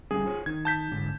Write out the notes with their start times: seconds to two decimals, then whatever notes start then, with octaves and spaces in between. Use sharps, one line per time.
0.11 D3 G3 C#4 G#4
0.25 F4 C5 C#5
0.46 D#3 D#4 G#6
0.65 A5 G6 B6
0.92 G#2 D3